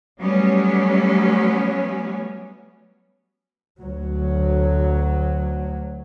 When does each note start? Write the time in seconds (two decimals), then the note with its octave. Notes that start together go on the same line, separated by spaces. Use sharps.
0.20 F#3 G3 A3 B3 C#4
3.79 D2 F#3